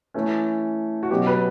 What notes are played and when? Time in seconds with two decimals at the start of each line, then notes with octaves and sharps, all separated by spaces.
0.14 E3 A3 C#4
1.03 F#4
1.11 B2 F#3 C#4 G4
1.27 B4